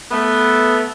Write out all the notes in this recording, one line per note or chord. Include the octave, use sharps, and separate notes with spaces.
A3 B3